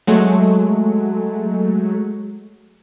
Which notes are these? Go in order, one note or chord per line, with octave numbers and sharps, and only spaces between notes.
F#3 G#3 A3